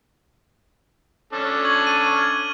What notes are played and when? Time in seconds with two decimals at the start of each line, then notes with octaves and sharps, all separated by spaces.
1.33 C#4 D4 A4
1.65 C#6 G#6 F#7
1.87 D#7
2.15 F6 G#6